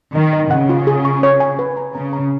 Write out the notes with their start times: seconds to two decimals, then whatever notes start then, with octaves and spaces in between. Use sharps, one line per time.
0.15 D#3 D#5
0.33 D#5
0.51 C#3 F#5
0.69 F4
0.87 G#4
1.05 C#6
1.23 C#5
1.40 G#5
1.59 B4
1.77 A#5
1.95 C#3 A#5
2.13 A#5